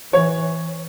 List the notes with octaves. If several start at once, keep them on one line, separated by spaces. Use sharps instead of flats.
E3 C#5